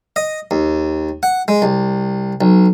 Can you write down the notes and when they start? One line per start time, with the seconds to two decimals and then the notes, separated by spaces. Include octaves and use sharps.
0.16 D#5
0.51 D#2
1.23 F#5
1.48 G#3
1.62 C2
2.41 B1